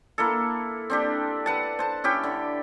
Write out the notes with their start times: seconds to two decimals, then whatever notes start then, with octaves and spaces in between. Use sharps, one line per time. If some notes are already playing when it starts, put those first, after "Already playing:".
0.18 A#3 E4 A4
0.90 C4 D4 G4
1.46 B4 F#5 A5
1.79 C5 A5
2.04 C#4 E4 G4 G5
2.24 D3